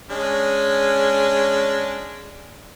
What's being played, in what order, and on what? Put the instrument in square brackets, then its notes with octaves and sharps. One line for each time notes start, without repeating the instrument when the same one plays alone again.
[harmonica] G#3 C#4 D4